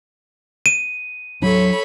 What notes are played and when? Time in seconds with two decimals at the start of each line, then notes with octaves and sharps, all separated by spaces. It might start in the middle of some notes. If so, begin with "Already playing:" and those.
0.66 D#7
1.42 F#3 D4 A4 C#5 B5